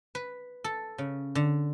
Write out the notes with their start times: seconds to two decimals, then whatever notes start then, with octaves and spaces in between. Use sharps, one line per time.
0.15 B4
0.64 A4
0.98 C#3
1.35 D3